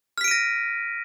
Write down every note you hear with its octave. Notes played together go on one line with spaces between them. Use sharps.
F6 A#6 B6 D7 D#7